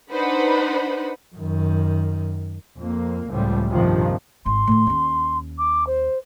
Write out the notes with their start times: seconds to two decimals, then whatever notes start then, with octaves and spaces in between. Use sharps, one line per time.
0.11 D4 D#4 B4 C5 F#5 B5
1.36 F#2 D#3
2.78 F2 A#3
3.31 C#2 A2 F3 G3
3.70 A#1 G2 C3 D#3 F3
4.45 G#1 E4 C6
4.67 A2 D#3
4.87 D#2 C#4
5.58 D6
5.87 C5